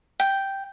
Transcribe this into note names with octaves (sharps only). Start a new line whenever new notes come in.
G5